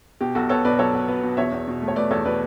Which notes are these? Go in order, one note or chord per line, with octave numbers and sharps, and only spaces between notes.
B2 G4
B1 F#4 A4
B3 A4 C#5
B2 B4 D5
F#3 A4 C#5
B3
B3
B2
E2 C#5 E5
E2
B2
A3
C#5
A3 B4 D5
E2 A4 C#5
B2 B4 D5